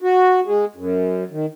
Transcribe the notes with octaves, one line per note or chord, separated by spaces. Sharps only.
F#4
G#3
F#2
D#3